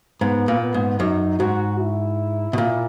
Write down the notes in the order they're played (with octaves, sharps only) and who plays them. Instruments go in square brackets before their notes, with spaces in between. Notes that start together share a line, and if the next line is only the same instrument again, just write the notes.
[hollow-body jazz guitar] G#2 [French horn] B3
[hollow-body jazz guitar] A#2
[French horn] B3
[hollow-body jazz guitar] G#2
[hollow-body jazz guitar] F#2 [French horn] D#4
[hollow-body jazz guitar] G#2 [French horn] F#4
[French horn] E4
[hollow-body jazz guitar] B2
A#2